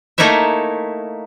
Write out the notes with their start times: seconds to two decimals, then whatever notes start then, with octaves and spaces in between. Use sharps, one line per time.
0.18 A3 A#3 D#4 E4 C#5 E5